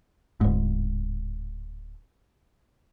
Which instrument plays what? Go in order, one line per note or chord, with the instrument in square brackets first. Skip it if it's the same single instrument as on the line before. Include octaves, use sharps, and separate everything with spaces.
[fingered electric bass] D1 G#2